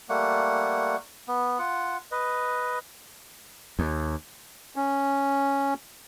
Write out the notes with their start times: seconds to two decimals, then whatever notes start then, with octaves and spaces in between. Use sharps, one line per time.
0.09 G3 A3 A#3 F#5
1.28 B3
1.59 F4 F#5
2.11 B4 D#5
3.79 D#2
4.76 C#4